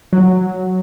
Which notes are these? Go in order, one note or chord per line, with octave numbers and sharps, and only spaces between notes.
F#3